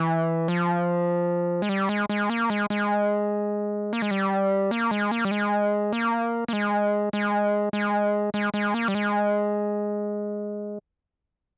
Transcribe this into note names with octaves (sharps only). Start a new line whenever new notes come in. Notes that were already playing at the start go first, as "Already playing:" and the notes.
Already playing: E3
F3
G#3
G3
G#3
G#3
A#3
G#3
G#3
A#3
G#3
G3
A#3
G#3
A#3
G3
G#3
A#3
A#3
G#3
G#3
G#3
G#3
G#3
A#3
G3
G#3